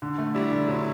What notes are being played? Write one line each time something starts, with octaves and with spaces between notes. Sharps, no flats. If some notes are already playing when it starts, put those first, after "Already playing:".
D3
A3
G3 E4
D3
D3 F#3